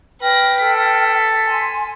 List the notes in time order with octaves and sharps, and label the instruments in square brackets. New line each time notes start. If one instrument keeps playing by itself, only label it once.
[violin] B4 A#6 [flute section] G5 F6
[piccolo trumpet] A4 [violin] B6
[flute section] G#5 C6